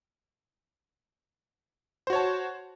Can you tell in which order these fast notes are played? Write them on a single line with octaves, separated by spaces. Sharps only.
C5 F#4 C#5 A5